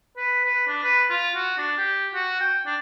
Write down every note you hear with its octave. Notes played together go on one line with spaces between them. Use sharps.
B4
B4
D4
B4
F4
F#4
D4
G4
F#4
G5
D4